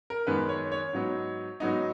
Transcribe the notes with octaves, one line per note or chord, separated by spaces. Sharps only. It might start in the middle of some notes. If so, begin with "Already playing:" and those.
A#4
F#2 D#3 G#3 B3 B4
C#5
C#5
G#2 F#3 B3 D#4
G#2 F#3 B3 D#4